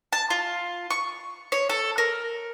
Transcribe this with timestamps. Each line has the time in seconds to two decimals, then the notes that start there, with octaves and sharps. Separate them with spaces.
0.13 A5
0.30 F4
0.90 C#6
1.52 C#5
1.69 A4
1.98 A#4